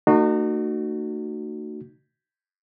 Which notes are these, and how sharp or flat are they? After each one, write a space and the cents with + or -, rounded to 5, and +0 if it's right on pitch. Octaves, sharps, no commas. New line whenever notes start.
A3 +40 D#4 -40 F#4 +0